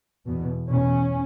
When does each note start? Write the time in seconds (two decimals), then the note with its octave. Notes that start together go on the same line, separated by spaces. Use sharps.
0.26 E2 B2
0.69 E2 B2 C#4